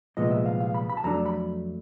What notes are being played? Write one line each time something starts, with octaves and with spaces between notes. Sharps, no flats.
C2 A#2 F3 G#3 B3 D#5
E5
F5
F5
B5
B5
A5
F2 D3 F#3 A3 D4 A#5
B5